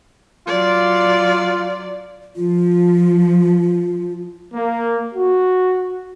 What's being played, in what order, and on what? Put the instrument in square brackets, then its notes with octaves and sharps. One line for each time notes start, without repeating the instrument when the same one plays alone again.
[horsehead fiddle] F#3 D5 [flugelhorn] F4
[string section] F3 [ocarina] F4
[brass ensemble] A#3
F#4